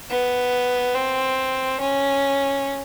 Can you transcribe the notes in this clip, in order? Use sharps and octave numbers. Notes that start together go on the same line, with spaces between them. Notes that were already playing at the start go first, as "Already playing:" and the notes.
B3
C4
C#4